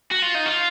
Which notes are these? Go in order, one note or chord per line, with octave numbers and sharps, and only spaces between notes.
F#4
F4
D#4
F4